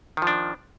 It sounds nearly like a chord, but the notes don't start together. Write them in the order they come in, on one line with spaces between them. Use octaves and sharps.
D#3 F3 D4